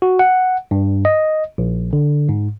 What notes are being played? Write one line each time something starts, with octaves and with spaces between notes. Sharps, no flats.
F#4
F#5
G2
D#5
A#1
D3
G#2